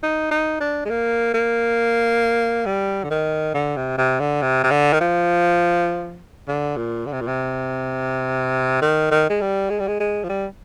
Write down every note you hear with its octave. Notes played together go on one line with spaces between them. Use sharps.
D#4
D#4
D4
G#3
A#3
A#3
G3
D3
D#3
D3
C3
C3
D3
C3
C3
D3
D#3
F3
D3
A#2
D3
C3
A#2
C3
D#3
D#3
G#3
G3
G#3
G3
G#3
G#3
F3
G3